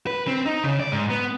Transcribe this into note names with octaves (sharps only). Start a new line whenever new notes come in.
B4
C4
D#4
C#3
D5
G#2
B3